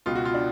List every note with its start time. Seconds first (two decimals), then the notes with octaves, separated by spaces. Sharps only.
0.06 C#2 B2 F4
0.15 F#4
0.25 F4
0.34 D4